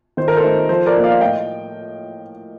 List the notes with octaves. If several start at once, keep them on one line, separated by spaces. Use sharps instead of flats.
D#3 C5
A#4
A4 C5
A3 C4 D#4
F3 A4 C5
A#4 D5
A#3 D#4
D5 F5
A2 D#5 G5